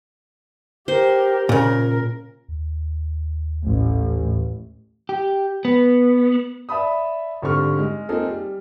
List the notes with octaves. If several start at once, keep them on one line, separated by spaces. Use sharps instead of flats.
G4 A#4 C5
A#2 C#3 A#4
D#2
A1
G4
B3
D5 E5 A5 B5 D#6
G#1 D3 G3 C4 C#6 F6
G#3
A#3 C4 D#4 F4 G#4 A4
G3